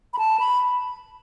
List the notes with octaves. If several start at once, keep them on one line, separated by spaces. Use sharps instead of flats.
B5
A5
B5